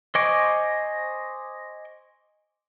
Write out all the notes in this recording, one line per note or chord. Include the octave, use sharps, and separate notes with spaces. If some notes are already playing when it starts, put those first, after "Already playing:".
C5 D#5 G#5 C#6 D6